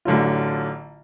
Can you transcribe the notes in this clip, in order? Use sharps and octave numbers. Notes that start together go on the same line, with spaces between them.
A1 D3 F#3 F4